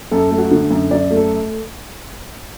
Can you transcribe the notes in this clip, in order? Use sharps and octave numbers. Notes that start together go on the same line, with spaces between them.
F#2 A4
A3
F#4
D3
F#2
F#2 D5
A3
A4